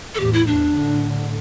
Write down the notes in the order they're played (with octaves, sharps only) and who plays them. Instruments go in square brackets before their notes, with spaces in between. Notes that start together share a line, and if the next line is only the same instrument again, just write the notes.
[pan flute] A4
[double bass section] E2 A2 [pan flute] G4
[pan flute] E4
[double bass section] E2 [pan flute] D4
[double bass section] A2 D3